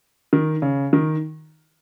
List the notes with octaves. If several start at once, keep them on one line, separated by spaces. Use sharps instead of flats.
D#3
C#3
D#3